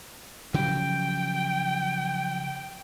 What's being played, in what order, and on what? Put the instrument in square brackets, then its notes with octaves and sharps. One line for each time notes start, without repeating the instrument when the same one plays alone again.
[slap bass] C#3 F3 F#3 [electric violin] G5